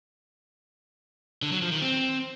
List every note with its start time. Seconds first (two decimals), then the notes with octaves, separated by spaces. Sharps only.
1.42 D3
1.52 F#3
1.62 F3
1.72 D#3
1.82 C4